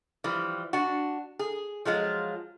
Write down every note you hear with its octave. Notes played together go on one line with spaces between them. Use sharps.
E3 F3 G3
D4 F#4
G#4
F3 F#3 G#3 F4